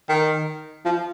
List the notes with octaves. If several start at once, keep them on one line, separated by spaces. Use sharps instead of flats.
D#3
F3